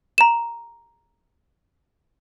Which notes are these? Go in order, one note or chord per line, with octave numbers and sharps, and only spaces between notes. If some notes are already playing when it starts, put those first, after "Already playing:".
A#5 E7